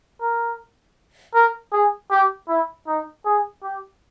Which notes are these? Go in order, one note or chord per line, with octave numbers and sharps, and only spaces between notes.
A#4
A#4
G#4
G4
E4
D#4
G#4
G4